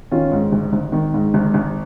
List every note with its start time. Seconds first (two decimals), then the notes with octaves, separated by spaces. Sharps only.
0.11 D#3 C#4 F4
0.31 G#2
0.52 G#1
0.73 G#1
0.92 D#3
1.14 G#2
1.34 G#1
1.54 G#1